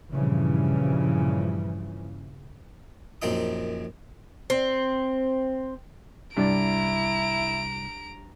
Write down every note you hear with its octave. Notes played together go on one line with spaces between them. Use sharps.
G2 A#2 C#3 E3 F3
A#1 F#2 C4 D#4 D#6
C4
C2 G2 E4 D5 A#5 D7